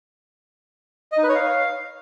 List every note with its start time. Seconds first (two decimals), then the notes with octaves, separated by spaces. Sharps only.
1.12 D#5
1.18 D#4
1.23 B4
1.29 C#5
1.35 F5